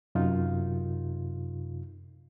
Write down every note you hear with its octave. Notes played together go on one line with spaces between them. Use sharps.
F#2 C3 D#4 F4